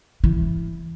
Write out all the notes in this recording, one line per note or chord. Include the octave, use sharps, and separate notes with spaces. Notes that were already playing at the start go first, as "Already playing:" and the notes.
E3